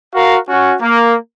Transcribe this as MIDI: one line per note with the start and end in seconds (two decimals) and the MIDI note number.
0.13 0.38 66
0.13 0.38 70
0.13 0.38 77
0.49 0.73 61
0.49 0.73 66
0.80 1.14 58